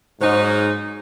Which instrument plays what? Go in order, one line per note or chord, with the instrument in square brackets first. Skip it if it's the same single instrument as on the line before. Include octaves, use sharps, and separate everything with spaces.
[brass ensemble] G#2 [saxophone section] F#3 C#4 D#4 [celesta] C5